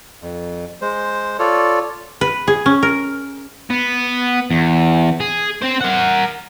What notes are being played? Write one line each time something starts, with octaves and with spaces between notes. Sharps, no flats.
F2
G#3 C5
F4 A4 C#5 D5
B4
G#4
C#4
A#4
B3
E2
G#4
C4 C5
A#4 F#5